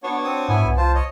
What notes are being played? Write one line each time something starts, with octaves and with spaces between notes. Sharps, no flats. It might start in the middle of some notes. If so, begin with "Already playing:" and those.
B3 D4 F#4 C#5
C4 D#6
G#2 B3 E4 G#5
C2
F4 C5 A5
C#5 D#5